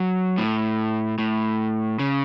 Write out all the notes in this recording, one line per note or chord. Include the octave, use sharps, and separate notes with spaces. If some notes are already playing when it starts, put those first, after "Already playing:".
Already playing: F#3
A2
A2
C#3